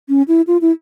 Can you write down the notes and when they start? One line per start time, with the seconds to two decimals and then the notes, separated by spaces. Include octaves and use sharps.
0.09 C#4
0.28 E4
0.47 F4
0.61 E4